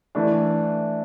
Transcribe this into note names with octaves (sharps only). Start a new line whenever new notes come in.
E3 A3 D4